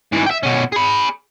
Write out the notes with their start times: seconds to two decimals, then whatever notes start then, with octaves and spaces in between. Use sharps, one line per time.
0.13 G#2 E3
0.27 E5 G5
0.43 B2 C#4
0.72 G#4 B5